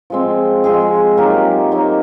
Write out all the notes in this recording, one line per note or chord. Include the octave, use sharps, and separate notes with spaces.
F3 G#3 C4
F3 G#3 C4 G#4
F#3 A#3 D#4 G4
F#3 A#3 D#4